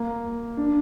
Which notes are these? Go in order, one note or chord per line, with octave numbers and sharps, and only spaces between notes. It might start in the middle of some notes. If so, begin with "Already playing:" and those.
Already playing: A#3
D4